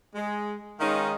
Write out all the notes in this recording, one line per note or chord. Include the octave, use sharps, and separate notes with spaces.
G#3
D#3 G#3 C#4 D#4 D#5 F5